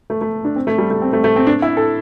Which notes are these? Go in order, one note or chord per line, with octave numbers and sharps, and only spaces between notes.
A3
A3
D4
C4
A3
G3
A3
C4
A3
A3
C4
D4
E4
A4